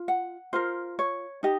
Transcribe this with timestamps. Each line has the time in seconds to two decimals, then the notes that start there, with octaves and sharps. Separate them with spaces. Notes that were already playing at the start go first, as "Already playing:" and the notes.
Already playing: F4
0.08 F#5
0.53 F4 A#4 C5
0.99 C#5
1.43 D#4 G4 D#5